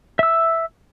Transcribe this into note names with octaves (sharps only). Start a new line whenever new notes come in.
E5 E6